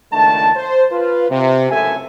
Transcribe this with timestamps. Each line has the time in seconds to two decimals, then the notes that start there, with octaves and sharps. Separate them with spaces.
0.12 C#2 D#3 A3 D4 A5
0.55 C5
0.91 F4 B4
1.30 C3
1.71 C#2 F#2 A2 A4 E5 G#5